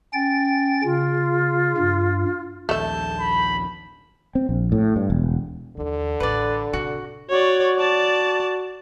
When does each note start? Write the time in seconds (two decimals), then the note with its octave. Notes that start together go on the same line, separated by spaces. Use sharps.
0.13 C#4 G5 A6
0.84 C#3 F4
1.77 G2
2.69 A#1 D#2 A3 E5 A5 G6
3.20 B5
4.35 C4
4.49 A#1
4.72 A2
4.96 G2
5.10 E1
5.77 D#2 D3 E3
6.20 A1 B4 D5
6.73 C3 F#4
7.30 F#4 C#5 D5
7.77 D5 A5